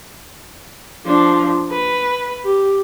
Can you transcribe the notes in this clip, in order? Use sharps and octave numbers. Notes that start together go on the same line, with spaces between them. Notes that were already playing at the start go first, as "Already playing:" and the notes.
F3 D4
B4
G4